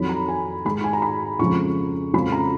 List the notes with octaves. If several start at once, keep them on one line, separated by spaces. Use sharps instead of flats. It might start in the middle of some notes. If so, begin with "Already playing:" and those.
Already playing: F2 D#3 F#3 B5
A#5
G#5
G#2 D#3 G#3 B5
G#5
A#5
B5
F2 C#3 F3 G#3 C#6
F2 C#3 F3 G#3 B5
A#5